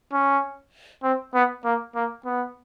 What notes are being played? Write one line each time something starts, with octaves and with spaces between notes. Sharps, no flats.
C#4
C4
B3
A#3
A#3
B3